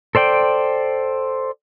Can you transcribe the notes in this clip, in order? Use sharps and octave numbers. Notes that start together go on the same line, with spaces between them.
A4 C5 D5 G5